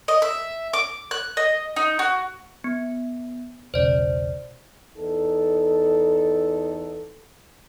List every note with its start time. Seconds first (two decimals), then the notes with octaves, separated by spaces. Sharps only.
0.08 D#5
0.22 E5
0.73 D6
1.11 F#6
1.37 D#5
1.76 D#4
1.99 F#4
2.64 B3
3.74 E1 B1 C#3 C5 D5
4.95 E2 D#4 A4